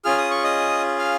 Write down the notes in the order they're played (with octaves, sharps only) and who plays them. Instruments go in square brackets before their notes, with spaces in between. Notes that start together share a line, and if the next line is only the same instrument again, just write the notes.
[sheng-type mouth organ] C#4 F4 G#4 F6
D#6
C#6
D#5 D#6
F5 F6